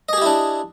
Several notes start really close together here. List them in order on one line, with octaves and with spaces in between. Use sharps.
D#5 G#4 G4 E4 D4